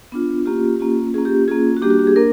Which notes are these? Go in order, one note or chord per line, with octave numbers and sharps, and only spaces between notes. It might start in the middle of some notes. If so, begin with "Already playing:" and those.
B3 D4 F4
A#3 C#4 F4 G4
A#3 C#4 F4
A#3 C#4 F4 G#4
G4
A#3 C#4 F4 G#4
F#4
G3 A#3 D4 G4
F#4
G4
G#4
A#3 D4 A#4